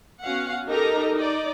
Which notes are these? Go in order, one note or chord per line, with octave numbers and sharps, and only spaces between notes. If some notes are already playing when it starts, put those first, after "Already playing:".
B3 C#4 F#4 F5 F#5
D#4 G4 A4 A#4 D#5 A#5
D#4 D5